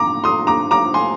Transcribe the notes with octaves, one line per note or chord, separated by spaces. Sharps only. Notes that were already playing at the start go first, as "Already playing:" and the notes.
Already playing: A#5 D6
C6 D#6
A#5 D6
A#5 D6
G#5 C6